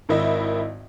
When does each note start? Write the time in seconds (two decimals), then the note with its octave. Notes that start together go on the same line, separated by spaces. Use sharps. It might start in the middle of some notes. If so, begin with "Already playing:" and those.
0.09 G#1 D#3 E4 D#5 E5